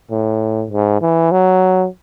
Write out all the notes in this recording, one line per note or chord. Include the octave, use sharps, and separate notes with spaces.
A2
G#2
E3
F#3